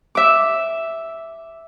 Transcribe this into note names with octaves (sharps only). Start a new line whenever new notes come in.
E5 D6